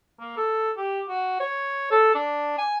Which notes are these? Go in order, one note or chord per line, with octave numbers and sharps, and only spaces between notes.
A#3
A4
G4
F#4
C#5
A4
D4
G#5